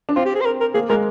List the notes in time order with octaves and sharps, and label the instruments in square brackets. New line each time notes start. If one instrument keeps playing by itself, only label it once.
[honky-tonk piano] D4
[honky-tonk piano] C4 [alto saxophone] F4
[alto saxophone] G4
G#4
C5
A#4
A#4
[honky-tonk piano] A#3 [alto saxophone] G#4
[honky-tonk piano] G#3 [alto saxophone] A#4